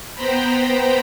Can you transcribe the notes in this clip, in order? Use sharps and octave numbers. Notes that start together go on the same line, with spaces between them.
B3 C5 G5 A#5 B5